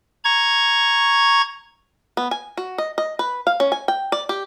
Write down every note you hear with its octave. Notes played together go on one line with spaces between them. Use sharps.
A#5 C#6 G#6
B3
G#5
F#4
D#5
D#5
B4
F5
C#4
G#5
G5
D5
G4